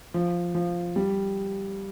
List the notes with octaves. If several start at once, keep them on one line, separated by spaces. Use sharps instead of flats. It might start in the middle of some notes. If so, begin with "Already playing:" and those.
F3
F3
G3